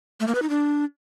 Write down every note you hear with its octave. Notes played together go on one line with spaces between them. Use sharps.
A3
A#3
B4
D#4
D4